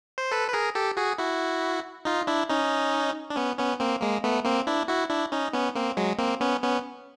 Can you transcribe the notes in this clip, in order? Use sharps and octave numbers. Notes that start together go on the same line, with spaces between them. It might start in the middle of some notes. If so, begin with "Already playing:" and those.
C5
A4 B4
B4
G#4 A#4
G4 A4
F#4 G#4
E4 F#4
D#4 F4
D4 E4
C#4 D#4
D4
B3 C#4
B3 C#4
A#3 C4
G#3 A#3
A3 B3
A#3 C4
D4 E4
E4 F#4
D4 E4
C#4 D#4
B3 C#4
A#3 C4
F#3 G#3
A#3 C4
B3 C#4
B3 C#4